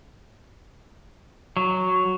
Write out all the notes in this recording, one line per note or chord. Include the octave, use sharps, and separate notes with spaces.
F#3